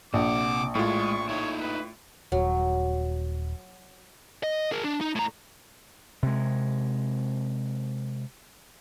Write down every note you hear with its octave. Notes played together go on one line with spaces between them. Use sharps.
A#1 C3 F#5 D6
A2 G#3 F4 C#6
D#4 E4 C#5
B4
D#1 F#3
D#5
G#4 A#4
D4
D#4
A2 A#5
C3 G#3